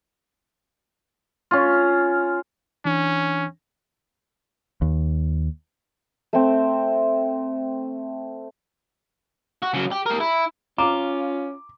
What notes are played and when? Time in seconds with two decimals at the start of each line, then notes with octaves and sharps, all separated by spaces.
1.51 C#4 F4
2.85 E3 C#4 D4
4.82 D#2
6.33 A3 C4
9.63 F#4
9.74 C#3 F#3
9.92 G4
10.06 G4 A#4
10.20 E4
10.78 C#4 F4 A#5 D6